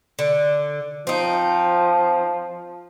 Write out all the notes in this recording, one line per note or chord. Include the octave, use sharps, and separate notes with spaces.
D3
F3 C4 D#4